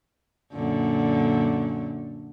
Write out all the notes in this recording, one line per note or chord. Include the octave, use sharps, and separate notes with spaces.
F#2 A#2 D3